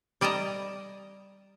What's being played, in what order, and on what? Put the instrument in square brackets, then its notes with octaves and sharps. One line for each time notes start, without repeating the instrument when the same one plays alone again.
[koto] G3 D5 D#5 A5 A#5